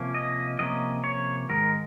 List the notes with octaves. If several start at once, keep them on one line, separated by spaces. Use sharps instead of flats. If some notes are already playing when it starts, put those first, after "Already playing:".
Already playing: C3 F3 A#3 C#4
D#5
C3 F3 A#3 C#4 D#5
C#5
G#2 D#3 G#3 A#4